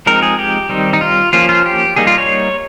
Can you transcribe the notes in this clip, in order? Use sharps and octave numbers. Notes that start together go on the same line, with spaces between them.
F3 G#3 C4 D#4 A#4
G#4
G4
D#3 G3 C4 D#4
D#4
F4
F3 A#3 C#4 F4
F4
G4
G3 A#3 D#4 G#4
F4
C#5